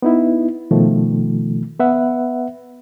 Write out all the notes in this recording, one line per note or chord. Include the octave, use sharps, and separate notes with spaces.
B3 D#4 E4
B2 D#3 F3 A3
B3 B4 E5 F#5